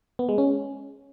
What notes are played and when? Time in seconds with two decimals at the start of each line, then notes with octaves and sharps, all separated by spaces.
0.19 B3
0.29 G#3
0.38 C#4